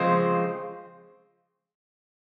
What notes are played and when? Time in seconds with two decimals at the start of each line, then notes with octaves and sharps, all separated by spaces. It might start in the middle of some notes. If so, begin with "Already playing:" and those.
Already playing: C#3 F3 G#3 C4 C5